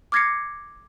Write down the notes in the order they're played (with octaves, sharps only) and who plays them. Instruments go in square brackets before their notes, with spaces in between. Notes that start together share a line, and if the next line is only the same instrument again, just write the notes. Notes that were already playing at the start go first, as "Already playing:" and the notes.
[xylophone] D6 F6 G#6 A#6 C7 C#7